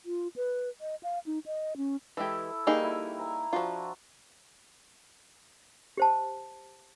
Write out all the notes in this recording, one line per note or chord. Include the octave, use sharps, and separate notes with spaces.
F4
B4
D#5
F5
D#4
D#5
C#4
E3 G#3 E4 G4 A4
G3 A#3 D#4 G#4 C#6
E4
G#5 A#5
F3 D4 F4 F#4
G4 C5 A5